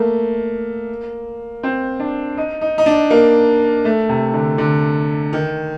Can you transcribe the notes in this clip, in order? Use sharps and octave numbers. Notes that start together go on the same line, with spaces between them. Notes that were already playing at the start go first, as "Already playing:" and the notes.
Already playing: A3 A#3
C4
D4
D#4
D#4
D#4
D4
A#3
A3
C3
D3
D3
D#3